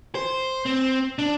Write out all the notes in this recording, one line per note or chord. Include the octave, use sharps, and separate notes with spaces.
C5
C4
D4